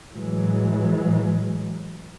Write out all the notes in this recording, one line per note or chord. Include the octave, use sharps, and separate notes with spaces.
A2 E3 F#3 G#3